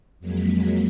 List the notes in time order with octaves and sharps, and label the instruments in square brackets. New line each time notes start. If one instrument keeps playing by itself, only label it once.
[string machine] F2 F#3 G#3 A#3 B6